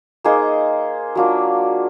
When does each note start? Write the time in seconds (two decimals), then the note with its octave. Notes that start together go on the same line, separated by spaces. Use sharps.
0.24 A#3 D#4 G#4 C5
1.15 F#3 A#3 D4 F4